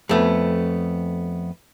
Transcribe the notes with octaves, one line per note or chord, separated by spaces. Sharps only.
F2 A3 B3